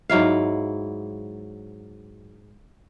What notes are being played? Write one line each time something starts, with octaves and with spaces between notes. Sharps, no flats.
G#2 F#3 E4 F5